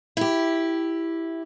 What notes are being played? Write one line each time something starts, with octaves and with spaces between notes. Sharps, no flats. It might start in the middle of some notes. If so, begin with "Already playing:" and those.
E4 G4